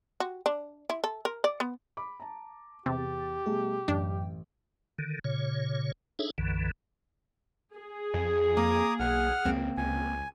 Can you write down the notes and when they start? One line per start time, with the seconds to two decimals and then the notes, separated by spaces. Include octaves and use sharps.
0.20 F#4
0.46 D4
0.90 E4
1.04 A4
1.25 A#4
1.44 D5
1.60 B3
1.97 B5 D6
2.20 A5 A#5
2.86 E2 C3 G4 A6
3.46 B2 G3 A3 G#4
3.88 A1 F#2 D4 G5
4.98 D3 D#3
5.24 A#2 C#3 C#5
6.19 D4 D#4 G#4 A4 C#5 E5
6.38 B1 F#2 D3 E3
7.76 G#4
8.14 F2
8.57 A#3 A#5 D6 D#6
8.99 B1 F#5 F6
9.45 C#2 A#3 C4
9.77 C#2 G#5